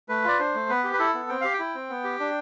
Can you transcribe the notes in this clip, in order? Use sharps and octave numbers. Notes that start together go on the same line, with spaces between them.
A3 B4
F4 D5
D4 C5
A3
B3 B4
G4
B4
E4 A4
B3
C4 G5
G4 F5
G5
E4
C4
B3
G4
D4